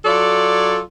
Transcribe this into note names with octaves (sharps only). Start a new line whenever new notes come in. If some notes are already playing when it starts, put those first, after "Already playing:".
F#3 F4 A4 D5